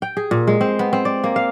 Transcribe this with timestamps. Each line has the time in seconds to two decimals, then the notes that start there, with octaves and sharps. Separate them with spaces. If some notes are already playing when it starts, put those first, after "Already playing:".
0.02 G5
0.17 G#4
0.31 A#2
0.47 G#3
0.61 C4
0.79 B3
0.93 C4
1.05 D5
1.24 A#3
1.36 F5